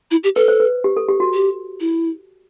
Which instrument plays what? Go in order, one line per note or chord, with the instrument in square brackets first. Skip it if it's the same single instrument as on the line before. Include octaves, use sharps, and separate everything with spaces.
[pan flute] E4
G4
[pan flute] A4 [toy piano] B4
[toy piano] C5
B4
G4
A4
G4
F#4
[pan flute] G4
E4